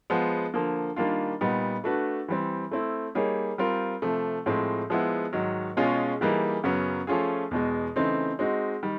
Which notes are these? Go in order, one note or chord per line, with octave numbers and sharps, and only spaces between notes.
F3 G#3 B3
D3 F3 A#3
D#3 G3 A#3 D4 F4
A#2 G3 B3 D#4
A3 D4 F#4 B4
E3 G3 C4
A3 C4 E4
G3 A#3 D#4 G#4 C#5
G3 C4 F4 A#4
C3 F3 A3
A2 F3 G#3 C4
F3 G#3 B3 E4
G#2 D#3 F#3
B2 G#3 C#4 F4 G#4
E3 G3 A#3 D#4 G#4
F#2 C#3 F#3 B3
F3 A3 C#4 F4 G#4
E2 B2 G#3
C#3 E3 A3 C4 D#4
G#3 C4 D#4 F#4
D#3 G3